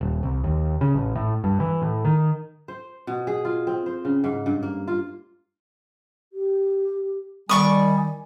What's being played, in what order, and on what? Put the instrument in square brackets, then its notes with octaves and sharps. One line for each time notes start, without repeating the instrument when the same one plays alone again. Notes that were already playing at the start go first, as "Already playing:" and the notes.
[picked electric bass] D#1
C2
D#2
C#3
A1
A2
G2
E3
A2
D#3
[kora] C5
B2
G#4
F4
C4
C5
C#3
G#2
G2
A#3
F4
[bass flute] G4
[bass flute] D#3 [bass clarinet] G3 [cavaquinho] D5 C#6 D#6 [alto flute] G#5